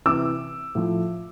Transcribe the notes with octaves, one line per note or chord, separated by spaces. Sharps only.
C3 E3 D6 E6
A2 F3